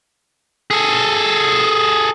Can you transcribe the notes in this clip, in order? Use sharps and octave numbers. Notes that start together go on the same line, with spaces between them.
G#4 A4